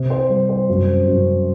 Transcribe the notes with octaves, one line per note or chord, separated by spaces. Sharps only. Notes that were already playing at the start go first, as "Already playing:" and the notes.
Already playing: C3
C5
G3
C5
F#2
F#2